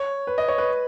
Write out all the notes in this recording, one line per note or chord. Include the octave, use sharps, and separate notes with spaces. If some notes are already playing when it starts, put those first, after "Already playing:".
Already playing: C#5
B4
D#5
C#5
B4